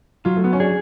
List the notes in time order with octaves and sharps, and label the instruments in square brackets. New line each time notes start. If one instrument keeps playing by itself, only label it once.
[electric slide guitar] F#3 [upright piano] F4
[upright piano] A3
B3
C#4
[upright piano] D4 [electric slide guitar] G#4